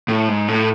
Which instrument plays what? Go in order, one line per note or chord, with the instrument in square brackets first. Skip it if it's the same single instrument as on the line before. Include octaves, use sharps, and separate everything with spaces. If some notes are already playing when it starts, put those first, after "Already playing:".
[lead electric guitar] A2
G#2
A2